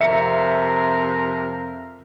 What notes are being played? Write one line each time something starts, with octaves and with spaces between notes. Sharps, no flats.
F2 C3 A#4 E5 C#7